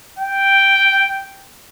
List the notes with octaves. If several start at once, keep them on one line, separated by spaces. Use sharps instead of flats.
G5